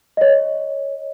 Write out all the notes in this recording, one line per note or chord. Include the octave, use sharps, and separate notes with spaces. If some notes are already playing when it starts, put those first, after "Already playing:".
C#5 D#5